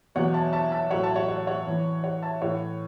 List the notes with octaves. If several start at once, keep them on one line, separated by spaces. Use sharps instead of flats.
E2 B2 F#3 C#5 F#5
E5 A5
E5 A5
E5 A5
A2 F#3 C#5 F#5
E5 A5
C#5 F#5
C#5 F#5
C#5 F#5
E2 E3
C#5 F#5
E5 A5
A2 E3 C#5 F#5